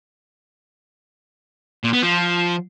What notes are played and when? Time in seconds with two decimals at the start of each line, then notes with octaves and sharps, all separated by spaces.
1.84 A#2
1.93 B3
2.03 F3